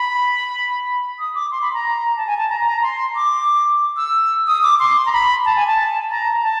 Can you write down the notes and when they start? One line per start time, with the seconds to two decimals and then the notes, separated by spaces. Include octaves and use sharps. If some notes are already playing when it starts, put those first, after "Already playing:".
Already playing: B5
1.19 D#6
1.35 D6
1.51 C6
1.62 B5
1.74 A#5
2.17 A5
2.27 G#5
2.38 A5
2.49 A#5
2.66 A#5
2.82 C6
3.16 D6
3.97 E6
4.47 D#6
4.63 D6
4.79 C6
5.06 A#5
5.12 B5
5.45 A5
5.56 G#5
5.67 A5
6.11 A#5
6.43 A5